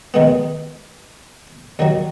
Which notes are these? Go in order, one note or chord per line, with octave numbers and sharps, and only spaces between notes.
D#2 D#3 G#3 B3
D#2 D#3 F#3